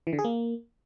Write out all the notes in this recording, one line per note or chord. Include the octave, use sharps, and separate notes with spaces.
E3
D3
G#4
A#3